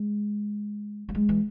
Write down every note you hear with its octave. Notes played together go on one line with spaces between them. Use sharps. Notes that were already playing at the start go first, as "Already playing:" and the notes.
Already playing: G#3
G3
G#3
E3